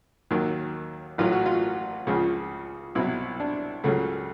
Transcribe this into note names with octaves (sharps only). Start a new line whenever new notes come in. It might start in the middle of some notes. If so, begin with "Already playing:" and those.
D#2 D#3 F#3
A1 A2 F#3 F4
F#4
F4
C#2 C#3 F3
C2 B2 F#3 E4
D4
C#2 C#3 F#3 A3